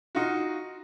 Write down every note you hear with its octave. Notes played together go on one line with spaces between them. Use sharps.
D#4 F4 F#4